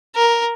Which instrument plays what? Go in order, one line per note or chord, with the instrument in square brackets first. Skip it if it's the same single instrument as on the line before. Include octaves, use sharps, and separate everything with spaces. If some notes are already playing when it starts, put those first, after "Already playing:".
[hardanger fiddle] A#4